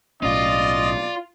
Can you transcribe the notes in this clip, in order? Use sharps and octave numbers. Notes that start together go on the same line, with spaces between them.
B1 A2 C#4 F4 D5 D#5